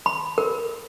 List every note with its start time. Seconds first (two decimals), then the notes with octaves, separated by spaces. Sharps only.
0.06 B5
0.38 A#4